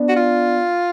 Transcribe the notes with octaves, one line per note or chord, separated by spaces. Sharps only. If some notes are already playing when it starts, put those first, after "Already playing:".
Already playing: B3 D4
F#4
F4